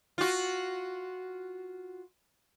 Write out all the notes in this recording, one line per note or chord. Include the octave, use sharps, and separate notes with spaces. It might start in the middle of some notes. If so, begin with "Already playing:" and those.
F4 F#4